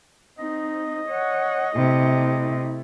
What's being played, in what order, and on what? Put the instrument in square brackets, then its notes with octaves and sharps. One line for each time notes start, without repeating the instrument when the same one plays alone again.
[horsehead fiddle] C4 D#4 [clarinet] D#5
[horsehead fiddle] C#5 F#5
[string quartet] C3 [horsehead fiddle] A3 E4